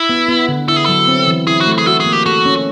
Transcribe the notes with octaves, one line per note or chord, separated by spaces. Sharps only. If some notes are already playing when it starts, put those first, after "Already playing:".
Already playing: E4
B3
B3
D3
E4 A4
G#4
F#3 A4
C4
E3
E4 G#4
F#4
A3
G#4
F#4 A4
G#4
A#3
G4
F#4 A4
C#4